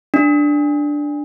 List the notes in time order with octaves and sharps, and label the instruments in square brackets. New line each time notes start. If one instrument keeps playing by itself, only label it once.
[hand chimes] D4